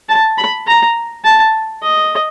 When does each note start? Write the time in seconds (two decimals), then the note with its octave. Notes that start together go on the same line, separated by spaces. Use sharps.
0.09 A5
0.38 B5
0.67 A#5
1.24 A5
1.82 D#5